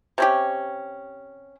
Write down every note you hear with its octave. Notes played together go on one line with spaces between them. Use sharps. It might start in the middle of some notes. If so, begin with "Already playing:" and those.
C3 C#4 G4